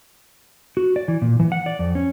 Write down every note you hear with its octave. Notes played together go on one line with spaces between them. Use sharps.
F#4
D5
E3
A#2
E3
F#5
D5
F2
C#4